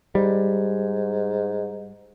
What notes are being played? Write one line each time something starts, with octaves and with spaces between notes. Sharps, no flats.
G#2 G3